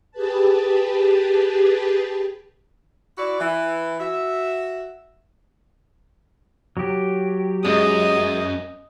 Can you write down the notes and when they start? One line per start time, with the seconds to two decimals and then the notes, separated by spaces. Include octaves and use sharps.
0.11 G4 G#4 B4 A5
3.17 E4 F#4 D5
3.40 E3
3.99 F#4 E5
6.77 F#3 G4
7.65 F#2 G#3 D#5